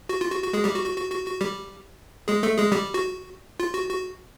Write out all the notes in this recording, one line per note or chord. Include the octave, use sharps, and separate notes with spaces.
F#4
F4
F#4
F#4
G#3 G#4
G3 G4
F#4
F#4
F#4
F#4
F#4
G3 G4
G#3 G#4
A3 A4
G#3 G#4
G3 G4
F#4
F4
F#4
F#4